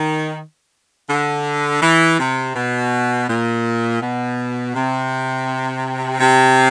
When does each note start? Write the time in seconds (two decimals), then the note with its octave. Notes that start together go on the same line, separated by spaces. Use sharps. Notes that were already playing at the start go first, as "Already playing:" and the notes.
Already playing: D#3
1.10 D3
1.82 E3
2.19 C3
2.56 B2
3.28 A#2
4.01 B2
4.75 C3
6.20 C3